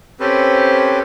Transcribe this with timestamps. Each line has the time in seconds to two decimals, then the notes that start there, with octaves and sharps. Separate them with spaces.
0.20 C4 C#4 G4 A4 B4 C5